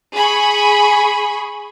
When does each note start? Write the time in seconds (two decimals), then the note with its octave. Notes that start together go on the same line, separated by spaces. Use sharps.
0.15 G#4 B5 C#6